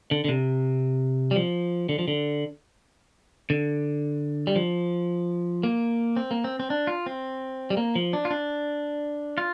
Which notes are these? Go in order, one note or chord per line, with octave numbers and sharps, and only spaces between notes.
D3
D3
C3
G3
F3
D3
F3
D3
D3
G3
F3
A#3
C4
A#3
C4
C4
D4
F4
C4
G3
A#3
F3
D4
F4
D4
F4